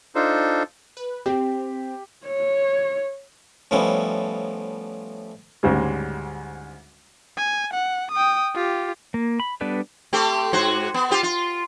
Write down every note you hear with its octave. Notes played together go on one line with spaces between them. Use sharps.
D4 D#4 F4 A4 C5
B4
C4 G4
C#5
A2 F3 G3 B3 C#4 E4
D2 G#2 C#3 G3 G#3
G#5
F#5
G5 D#6
F4 G4
A#3
B5
G3 B3 D4 A4 B4
A3 C4 G4
G#2 F#4 C5
B3
C4 F4 G4
F4